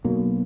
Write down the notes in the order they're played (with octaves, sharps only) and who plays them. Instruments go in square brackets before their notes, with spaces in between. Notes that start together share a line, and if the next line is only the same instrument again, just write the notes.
[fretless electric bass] B1 B2 F#3 A#3